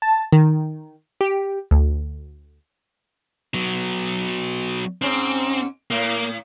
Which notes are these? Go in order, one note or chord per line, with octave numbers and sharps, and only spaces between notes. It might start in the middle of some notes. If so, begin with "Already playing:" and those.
A5
D#3
G4
D2
F#3 B3
G#2 C4 C#4
A2 A#3